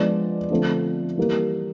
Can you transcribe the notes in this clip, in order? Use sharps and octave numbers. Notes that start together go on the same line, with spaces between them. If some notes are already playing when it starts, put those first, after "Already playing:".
Already playing: F3 G#3 B3 D4 D5
D3 F3 A3 C4
E3 G3 A#3